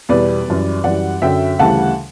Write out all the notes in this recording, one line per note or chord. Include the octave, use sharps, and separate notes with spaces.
E2 B2 G3 B4 D5
F#2 E3 G3
F#2 E3 G3 D5 F#5
F#2 D3 F#3 E5 G5
D2 C#3 E3 G3 F#5 A5